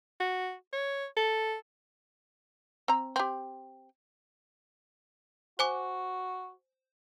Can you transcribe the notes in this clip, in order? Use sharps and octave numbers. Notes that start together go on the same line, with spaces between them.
F#4
C#5
A4
C4 A#5
C4 G4
F#4 C5 G#5 D6